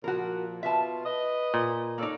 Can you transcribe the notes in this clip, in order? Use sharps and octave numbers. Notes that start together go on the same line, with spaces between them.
A#2 F3 F#4 A#4
B2 F4 E5 A5
B4 D#5
A#2
A#3 D#4 A4 C#5 D5